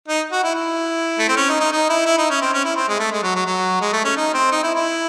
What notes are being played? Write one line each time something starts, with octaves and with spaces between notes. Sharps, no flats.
D#4
F#4
E4
E4
A3
C4
C#4
D#4
D#4
D#4
E4
E4
D#4
C#4
C4
C#4
E4
C4
G#3
A3
G#3
F#3
F#3
F#3
G#3
A3
C#4
D#4
C4
D#4
E4
E4